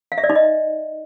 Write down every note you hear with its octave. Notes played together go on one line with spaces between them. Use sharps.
F5
E5
D5
D#4
D#5